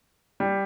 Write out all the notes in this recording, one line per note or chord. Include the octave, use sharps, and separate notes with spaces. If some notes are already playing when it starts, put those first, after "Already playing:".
G3